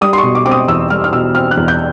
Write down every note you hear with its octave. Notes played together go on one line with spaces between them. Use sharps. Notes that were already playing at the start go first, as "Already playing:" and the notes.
G3 D#6
C6
C#6
B2
D6
C4 D6
D#6
E2 E6
G3 F6
F6
B2 E6
C4 F6
F#6
E2
G6